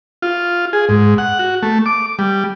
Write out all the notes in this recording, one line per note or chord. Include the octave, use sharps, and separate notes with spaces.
F4
G#4
G#2
F#5
F#4
A3
D6
G3